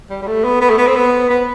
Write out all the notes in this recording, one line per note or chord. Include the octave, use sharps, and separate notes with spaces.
G3
G3
A3
B3
B3
A3
B3
C4
B3
B3